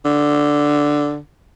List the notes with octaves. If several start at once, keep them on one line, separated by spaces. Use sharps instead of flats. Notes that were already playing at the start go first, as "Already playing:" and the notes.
D3